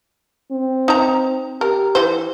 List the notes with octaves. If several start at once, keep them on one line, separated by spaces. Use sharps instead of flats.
C4
D#4 A#5
G4 A#4
E3 C5